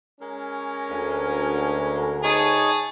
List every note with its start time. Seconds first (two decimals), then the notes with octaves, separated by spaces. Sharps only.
0.21 G#3 C#4 A#4
0.90 D2
2.24 D#4 G#4 C#5 A5